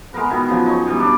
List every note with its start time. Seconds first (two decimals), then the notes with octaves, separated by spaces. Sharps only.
0.13 G#3 B3 A#4 B4
0.30 B2 D#3 E4
0.48 F#2 C#3 F3
0.66 D#4 C#5
0.87 B2 E3 G3
1.00 D4 D5